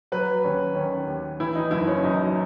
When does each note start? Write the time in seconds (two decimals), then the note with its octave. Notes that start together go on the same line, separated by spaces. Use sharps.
0.12 F#3 B4
0.44 D#2 C#4
0.75 D#3 C#4
1.07 D#2
1.40 E3 E4
1.55 D#4
1.71 F#1 E4
1.87 C#4
2.04 F#2 D#4